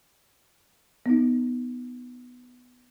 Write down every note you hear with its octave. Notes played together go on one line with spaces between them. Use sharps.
B3 D#4